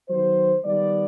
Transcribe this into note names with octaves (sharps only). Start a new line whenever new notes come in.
D#3 F#3 B3 C5
D#3 G3 B3 D5